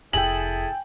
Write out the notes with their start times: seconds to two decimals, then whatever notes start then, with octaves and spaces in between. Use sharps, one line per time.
0.13 F1 E4 G#4 A4 G5 G#5 F#7